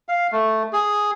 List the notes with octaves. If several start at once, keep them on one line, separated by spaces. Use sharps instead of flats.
F5
A3
G#4